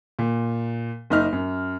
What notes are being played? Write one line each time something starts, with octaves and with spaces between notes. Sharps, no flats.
A#2
F#1 D#4 F6
F#2